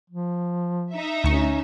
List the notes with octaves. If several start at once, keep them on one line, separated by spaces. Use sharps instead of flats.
F3
D#4 E5
D2 C#4 C#6